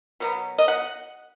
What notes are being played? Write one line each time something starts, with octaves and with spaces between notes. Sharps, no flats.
B2 F#3 B3
D#5
F#5